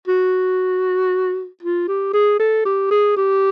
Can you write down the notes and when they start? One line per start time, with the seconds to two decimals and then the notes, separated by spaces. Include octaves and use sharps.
0.07 F#4
1.62 F4
1.88 G4
2.13 G#4
2.39 A4
2.65 G4
2.91 G#4
3.17 G4